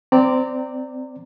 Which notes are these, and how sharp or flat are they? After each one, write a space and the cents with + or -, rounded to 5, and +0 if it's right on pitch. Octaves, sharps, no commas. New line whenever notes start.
C4 -15 D5 +0 A#5 -25